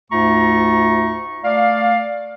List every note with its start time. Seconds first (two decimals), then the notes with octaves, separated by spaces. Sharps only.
0.11 D2 G#2 A3 F4 A#5 C#6
1.44 A3 D5 F5